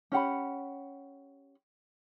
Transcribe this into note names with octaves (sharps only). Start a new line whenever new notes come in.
C#4 G4 F#5 B5